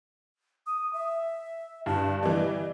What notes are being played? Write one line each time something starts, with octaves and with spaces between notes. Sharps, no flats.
D#6
E5
G2 A5
E3 G3 D#5